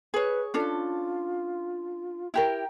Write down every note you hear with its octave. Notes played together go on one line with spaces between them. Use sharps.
G#4 B4 C#5
C#4 D4 F4 A4
E4 G4 A#4 G5